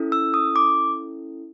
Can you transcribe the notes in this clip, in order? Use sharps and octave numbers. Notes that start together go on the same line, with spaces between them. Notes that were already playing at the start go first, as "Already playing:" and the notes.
Already playing: C#4 E4 A4
E6
D#6
D6